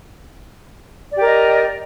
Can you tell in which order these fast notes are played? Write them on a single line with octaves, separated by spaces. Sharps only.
D5 G4 A#4 D#5